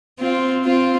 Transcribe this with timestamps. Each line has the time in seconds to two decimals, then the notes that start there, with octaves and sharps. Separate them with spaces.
0.19 C4 F4
0.65 C4 F4